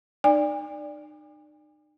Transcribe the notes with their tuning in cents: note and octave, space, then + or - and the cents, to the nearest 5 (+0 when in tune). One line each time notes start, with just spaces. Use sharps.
D#4 -45 D5 +0 G#5 -45